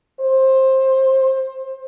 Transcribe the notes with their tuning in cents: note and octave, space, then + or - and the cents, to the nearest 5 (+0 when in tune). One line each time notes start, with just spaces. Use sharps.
C5 +20